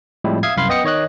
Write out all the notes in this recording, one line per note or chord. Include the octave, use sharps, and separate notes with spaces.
A2 F3 G3 G#3 C4 E4
E5 F5 D#6 G#6 C7
C2 F#2 F5 B5 C6
B3 D#5 G5 D#6 A#6 C#7
D#3 C#5 D#5 F#6